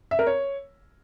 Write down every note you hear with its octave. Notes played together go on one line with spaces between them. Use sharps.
E5
A#4
C#5